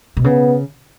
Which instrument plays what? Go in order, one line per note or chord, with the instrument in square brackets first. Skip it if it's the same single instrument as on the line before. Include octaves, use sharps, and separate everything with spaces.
[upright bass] B2
[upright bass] C#3 [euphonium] B3